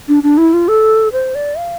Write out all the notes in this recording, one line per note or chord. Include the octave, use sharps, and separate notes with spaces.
D4
D4
E4
F4
A4
C5
D5
F5